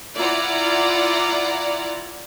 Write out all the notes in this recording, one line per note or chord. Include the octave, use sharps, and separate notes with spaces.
E4 F4 D5 F#5 A#5